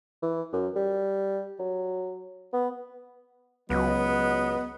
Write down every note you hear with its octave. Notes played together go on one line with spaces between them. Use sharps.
E3
F#2
G3
F#3
B3
C#2 F#3 B3 D#5